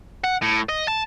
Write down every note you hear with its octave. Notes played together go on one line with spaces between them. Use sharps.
F#5
A2
D#5
A5